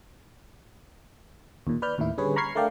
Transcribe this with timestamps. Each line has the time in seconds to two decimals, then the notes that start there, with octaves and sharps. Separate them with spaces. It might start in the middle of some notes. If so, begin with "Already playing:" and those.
1.67 D#2 A#2
1.82 B4 D5 F6 G6
1.98 D#2 A2 D#3 E4
2.18 D3 G3 C#4 G#4 B4 C#5
2.36 A#5 B5 C#6 F6 G#6 C7
2.55 A3 D4 A#4 D5 F5 G5